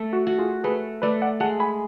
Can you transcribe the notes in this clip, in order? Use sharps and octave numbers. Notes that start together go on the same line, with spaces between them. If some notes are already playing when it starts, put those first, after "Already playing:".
Already playing: A3
F#4
F#4
F4 G#4
A3 G#4 B4
A3 B4 D5
D5 F#5
G#3 F#5 A5
G#5 B5